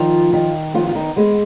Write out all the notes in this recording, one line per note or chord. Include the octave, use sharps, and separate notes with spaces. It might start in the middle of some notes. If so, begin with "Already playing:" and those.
Already playing: D#3 F3 F4
D#3
F3 B3 F4
F4
D#3 D#4
G#3 B3